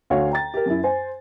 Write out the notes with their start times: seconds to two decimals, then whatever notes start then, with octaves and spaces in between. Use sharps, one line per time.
0.10 D2 F#4 C#5 F5
0.31 G5 A#5 A6
0.54 G4 A#4
0.66 F#2 E4
0.84 C5 G#5